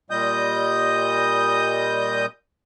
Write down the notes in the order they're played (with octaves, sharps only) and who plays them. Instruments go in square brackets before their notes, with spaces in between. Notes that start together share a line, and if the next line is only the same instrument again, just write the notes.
[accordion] A#2 G3 D#5 D#6 G6